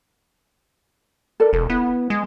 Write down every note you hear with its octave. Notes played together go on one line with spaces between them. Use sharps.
A4 A#4 D5
E1 A4
B3 E4
G#3